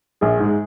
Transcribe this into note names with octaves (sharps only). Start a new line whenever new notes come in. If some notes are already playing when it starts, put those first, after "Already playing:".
A#1 G#4
G#2 G#3